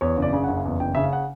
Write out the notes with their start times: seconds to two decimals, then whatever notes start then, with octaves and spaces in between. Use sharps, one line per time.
0.01 E2 C#5
0.17 F#1
0.22 D5
0.33 C#3
0.44 F#1 F#5
0.65 E2
0.80 F#1 G5
0.95 C#3 E5
1.04 F5
1.13 F#5